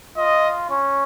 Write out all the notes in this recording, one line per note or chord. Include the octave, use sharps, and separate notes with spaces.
F4 D#5
C#4